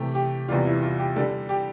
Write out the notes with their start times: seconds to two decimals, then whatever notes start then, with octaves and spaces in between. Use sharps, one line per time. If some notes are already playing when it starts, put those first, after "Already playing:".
Already playing: C3 E3 A3 G4
0.15 G4
0.48 E2 C3 E3 G3 D4 F4
0.66 E4
0.82 F4
0.99 G4
1.16 D3 G3 D4 A4
1.49 G4